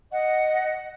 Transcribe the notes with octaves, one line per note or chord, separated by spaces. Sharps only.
D#5 F#5